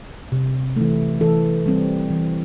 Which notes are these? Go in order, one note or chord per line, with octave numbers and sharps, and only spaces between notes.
C3
E3 A3
E3 A4
G3 C4
E3